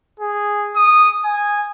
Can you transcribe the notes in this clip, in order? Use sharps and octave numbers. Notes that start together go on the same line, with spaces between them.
G#4
D#6
G#5